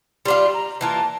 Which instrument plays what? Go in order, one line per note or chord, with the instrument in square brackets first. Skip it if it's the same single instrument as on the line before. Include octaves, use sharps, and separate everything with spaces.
[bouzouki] G3 D4 F4 [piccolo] C6
[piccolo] A#5
[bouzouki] E3 A#3 F4 [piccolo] A5